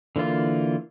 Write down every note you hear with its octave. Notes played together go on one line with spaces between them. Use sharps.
D3 E3 A#3 F4